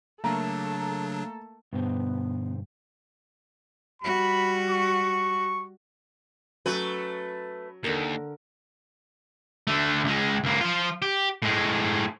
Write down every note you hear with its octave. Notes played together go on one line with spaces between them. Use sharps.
C#3 F#3 A3 A#3 D4 A4 A#5
G2 B2 D3 B3 C5
G3 F#4 B5
C#6
F#3 A3 C#4 B4
D#2 D3 A#4
D3 A3
C#2 G#3
C#2 A#3
F3 F4
G4
A2 G#3